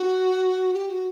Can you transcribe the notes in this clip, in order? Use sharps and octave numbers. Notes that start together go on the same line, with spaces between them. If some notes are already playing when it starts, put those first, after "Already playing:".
Already playing: F#4
G4
F#4